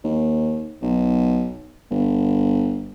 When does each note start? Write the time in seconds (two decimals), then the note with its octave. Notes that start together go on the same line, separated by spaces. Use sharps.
0.04 D#2
0.82 B1
1.91 G1